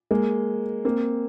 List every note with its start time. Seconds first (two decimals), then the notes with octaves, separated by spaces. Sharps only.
0.11 G#3 A#3
0.85 A#3 C4